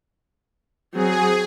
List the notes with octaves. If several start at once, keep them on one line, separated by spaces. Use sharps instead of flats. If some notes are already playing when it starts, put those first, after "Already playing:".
F#3 C4 G#4